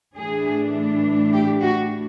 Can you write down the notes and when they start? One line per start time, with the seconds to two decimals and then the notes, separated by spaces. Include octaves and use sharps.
0.16 A2 E3 A3 D4 G#4
1.32 G4
1.61 F#4